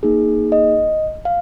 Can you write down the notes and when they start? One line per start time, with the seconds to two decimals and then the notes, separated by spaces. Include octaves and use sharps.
0.03 A#3 D#4 G#4
0.52 D#5
1.25 F5